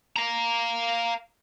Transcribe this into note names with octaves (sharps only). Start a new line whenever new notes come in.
F5 A#5